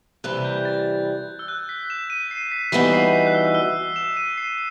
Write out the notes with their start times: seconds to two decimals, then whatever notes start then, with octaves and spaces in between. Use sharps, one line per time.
0.24 C3 E3 G3 F#6
0.45 G6
0.56 G6
0.65 A6
1.39 E6
1.48 F#6
1.69 B6
1.90 E7
2.10 D#7
2.31 C7
2.52 B6
2.72 E3 G3 B3 D#4 F#4 B6
2.93 C7
3.13 B6
3.26 F#6
3.34 E6
3.54 E6
3.96 E7
4.17 D#7
4.38 C7